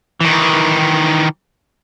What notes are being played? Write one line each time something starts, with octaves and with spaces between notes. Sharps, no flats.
D#3 E3